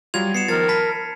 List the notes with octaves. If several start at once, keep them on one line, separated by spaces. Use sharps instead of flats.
F#3 G3 F4 G#6 F7
B3 C7 C#7 E7
D#3 F3 A#4 A6
A5 B5 B6